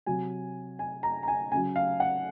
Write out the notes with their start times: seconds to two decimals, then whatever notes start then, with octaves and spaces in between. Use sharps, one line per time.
0.06 C3 F#3 G#5
0.79 G#5
1.03 A#5
1.23 A#5
1.28 G#5
1.52 C#3 G#5
1.56 F#3
1.76 F5
2.00 F#5